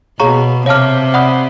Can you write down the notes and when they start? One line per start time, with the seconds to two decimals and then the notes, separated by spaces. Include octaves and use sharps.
0.20 B2 G#4 C#5 F5 A#5 C#6
0.66 C3 C#5 F5 A5 D6 F6
1.14 D5 F#5 B5 D#6 F#6